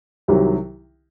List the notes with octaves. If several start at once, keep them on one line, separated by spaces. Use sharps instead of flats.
C2 C3 D#3 F#3